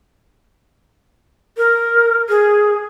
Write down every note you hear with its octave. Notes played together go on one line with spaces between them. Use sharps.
A#4
G#4